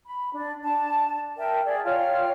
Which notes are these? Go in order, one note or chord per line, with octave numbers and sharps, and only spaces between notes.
B5
D4
D4 A5
A#4 E5 G5 A5
G#4 D5
F4 C#5 G5 F6